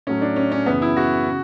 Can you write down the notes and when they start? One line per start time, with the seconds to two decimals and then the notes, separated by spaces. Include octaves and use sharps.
0.07 A2 F#3 A3 C#4
0.21 D4
0.36 C#4
0.52 C#4
0.66 F#2 C#3 E3 B3
0.82 E4
0.97 F#4
1.27 C#3